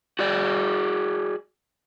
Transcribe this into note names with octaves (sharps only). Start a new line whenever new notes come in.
F#4 G#4 D5